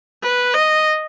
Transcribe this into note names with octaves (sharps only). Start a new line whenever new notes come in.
B4
D#5